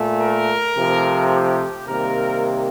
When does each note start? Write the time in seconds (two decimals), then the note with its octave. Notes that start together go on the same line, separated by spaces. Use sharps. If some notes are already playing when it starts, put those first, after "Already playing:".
Already playing: A#2 A3
0.20 A#4
0.76 C3 F3 A3
1.31 G4
1.86 C3 D#3 G3 A#3 A#4